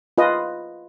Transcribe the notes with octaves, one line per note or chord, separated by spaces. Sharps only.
F4 B4 D#5